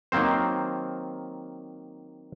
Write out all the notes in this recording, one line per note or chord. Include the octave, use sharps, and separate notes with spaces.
D#3 F#3 A#3 C4 C5